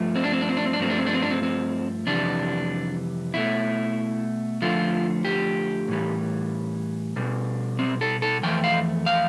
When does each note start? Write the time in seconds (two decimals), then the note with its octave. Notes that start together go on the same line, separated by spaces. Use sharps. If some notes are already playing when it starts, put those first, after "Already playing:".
Already playing: G2 F3 A3
0.16 C4
0.24 D4
0.32 C4
0.41 D4
0.49 C4
0.57 D4
0.66 C4
0.73 D4
0.80 G2 F3 A3 C4
0.90 D4
0.98 C4
1.06 D4
1.14 C4
1.22 D4
1.30 C4
1.43 C4
2.07 F2 C3 E3 G3 D4
3.34 B2 A3 E4
4.61 F2 D3 F3 A3 F4
5.25 G4
5.88 A2 E3 G3
7.16 B2 G3
7.79 C4
8.01 A4
8.22 A4
8.43 F2 E3 A3 G5
8.64 F5
9.06 F5